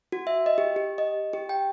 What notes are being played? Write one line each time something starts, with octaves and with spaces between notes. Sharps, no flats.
F#4
E5
D#5
G4
G4
D#5
G4
G5